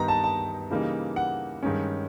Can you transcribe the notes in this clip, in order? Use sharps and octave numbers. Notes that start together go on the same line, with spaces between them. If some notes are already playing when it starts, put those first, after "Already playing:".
Already playing: G2 D#3 G3 B3 D#4 A#5
A5
A5
C#3 E3 G3 A#3 D#4
F#5
G2 D#3 G#3 C#4